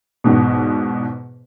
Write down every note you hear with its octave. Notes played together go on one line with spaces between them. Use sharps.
E2 G#2 B2